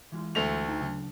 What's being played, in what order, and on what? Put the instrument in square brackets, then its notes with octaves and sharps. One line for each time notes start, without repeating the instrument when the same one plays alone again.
[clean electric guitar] E3 G#3 F4
[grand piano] D2 A3 F7
[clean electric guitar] D#4 G5
C#3 F#3 D4